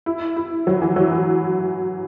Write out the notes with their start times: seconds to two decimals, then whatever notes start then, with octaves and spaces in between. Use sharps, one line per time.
0.06 E4
0.36 E4
0.67 F#3
0.82 E3
0.96 F#3
1.11 E3